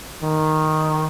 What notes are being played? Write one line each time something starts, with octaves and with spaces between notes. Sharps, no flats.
D#3